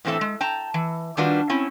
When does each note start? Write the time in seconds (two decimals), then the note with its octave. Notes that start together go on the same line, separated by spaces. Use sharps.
0.05 A2 E3 C4 F4 A4 E5
0.21 G#3
0.41 G5 A5 A#5
0.74 E3
1.17 D#3 G3 D4 F4 F#4 B4
1.49 C4 C#4 E4